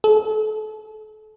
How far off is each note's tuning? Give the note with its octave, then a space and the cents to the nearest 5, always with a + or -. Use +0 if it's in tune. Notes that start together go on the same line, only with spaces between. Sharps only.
A4 -35